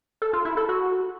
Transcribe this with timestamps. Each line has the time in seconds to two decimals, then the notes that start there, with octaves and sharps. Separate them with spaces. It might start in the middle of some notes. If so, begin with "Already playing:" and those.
0.22 A4
0.33 F4
0.45 E4
0.57 A4
0.69 F#4